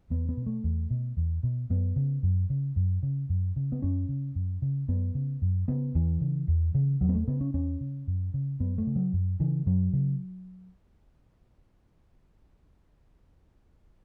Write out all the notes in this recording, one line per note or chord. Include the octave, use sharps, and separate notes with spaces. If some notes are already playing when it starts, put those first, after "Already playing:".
E2 B3
B3
B2
A3
E2
B2
E2
B2
F#2 B3
C#3
F#2
C#3
F#2
C#3
F#2
C#3
B3
F#2 C#4
C#3
F#2
C#3
F#2 B3
C#3
F#2
C#3 B3
E2 E3
C#3
E2
C#3
E2 F#3
B3
A3
C#3 B3
C#4
E2 C#4
C#3
F#2
C#3
F#2 B3
A3
C#3
F#3
F#2
C#3 E3
F#2 F#3
C#3